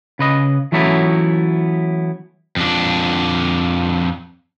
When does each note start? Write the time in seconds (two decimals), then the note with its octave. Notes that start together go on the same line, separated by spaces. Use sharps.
0.19 C#3 B4 D#5
0.72 E3 F#3 A3 B3 C#4 E4
2.56 F2 D4